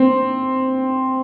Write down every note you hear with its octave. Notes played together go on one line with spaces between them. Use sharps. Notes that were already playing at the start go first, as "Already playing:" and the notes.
Already playing: C4